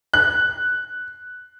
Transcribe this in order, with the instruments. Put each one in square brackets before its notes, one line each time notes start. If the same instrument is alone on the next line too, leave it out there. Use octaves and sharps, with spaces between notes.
[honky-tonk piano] F#6